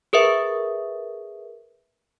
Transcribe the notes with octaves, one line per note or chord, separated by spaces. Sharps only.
G#4 A#4 B4 E5